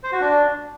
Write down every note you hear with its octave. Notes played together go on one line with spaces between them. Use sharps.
C5
F#4
D4